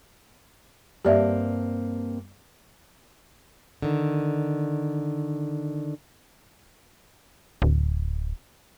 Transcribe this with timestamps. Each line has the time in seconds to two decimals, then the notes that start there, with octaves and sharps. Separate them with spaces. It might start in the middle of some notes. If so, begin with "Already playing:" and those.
1.05 G2 A#3 C4 G4 D5 E5
3.82 D3 D#3
7.62 D1